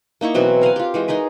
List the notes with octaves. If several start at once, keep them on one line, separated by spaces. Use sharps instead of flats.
A#3 D#4 E4 C#6
B2 E3 F#3 C4
A#4 F5 F#5 G#5
F4 G4
E3 G#3 F#4
D#4 G#4 A#4 B4